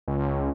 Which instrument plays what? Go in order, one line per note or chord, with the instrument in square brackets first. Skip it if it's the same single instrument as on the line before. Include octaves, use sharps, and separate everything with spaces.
[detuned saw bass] C#2